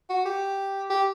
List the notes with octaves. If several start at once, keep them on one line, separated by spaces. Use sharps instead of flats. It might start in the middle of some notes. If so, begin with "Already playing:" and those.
F#4
G4
G4